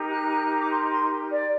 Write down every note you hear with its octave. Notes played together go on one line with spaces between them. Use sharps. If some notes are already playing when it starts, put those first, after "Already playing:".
Already playing: D#4 G4 A#4
F#6
D6
C6
C6
D5